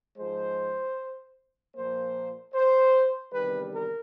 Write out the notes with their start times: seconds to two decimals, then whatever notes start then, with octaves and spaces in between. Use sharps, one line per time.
0.17 G#2 F3 G#3 C5
1.75 A#2 F3 A#3 C5
2.54 C5
3.33 E2 C3 D#3 G3 B4
3.72 A#4